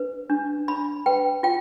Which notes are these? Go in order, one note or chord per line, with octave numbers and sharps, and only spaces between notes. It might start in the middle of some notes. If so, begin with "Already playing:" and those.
Already playing: D4 B4
D4
D4 B5
B4 G5
F4 G5